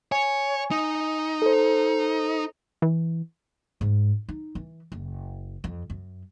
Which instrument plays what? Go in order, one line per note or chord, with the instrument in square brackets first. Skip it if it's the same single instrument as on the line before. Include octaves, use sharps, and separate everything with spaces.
[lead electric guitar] C#5 [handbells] G#5
[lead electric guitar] D#4
[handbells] A4 C5
[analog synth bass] E3
[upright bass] G#2
D#4
E3
F#1
F2
F#2